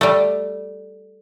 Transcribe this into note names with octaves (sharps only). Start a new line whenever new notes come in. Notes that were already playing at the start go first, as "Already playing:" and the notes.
G3 A3